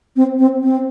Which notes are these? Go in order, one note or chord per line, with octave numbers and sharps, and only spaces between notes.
C4
C4
C4